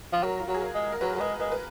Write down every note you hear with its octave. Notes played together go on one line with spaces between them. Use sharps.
F3
F#3 A#4
F4
F#3 F#4
G#4
A#4
G#3
A#4
F#3 B4
F#3
G#3 B4
G#3 B4
B4